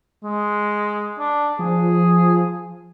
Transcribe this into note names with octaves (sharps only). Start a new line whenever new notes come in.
G#3
D4
F3 G#4